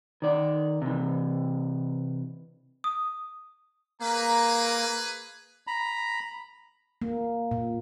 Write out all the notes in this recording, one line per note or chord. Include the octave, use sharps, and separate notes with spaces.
D#3 D5
C3 E3
D#6
A#3 G#4 B4 A#5
A#5 B5
A#3
A#2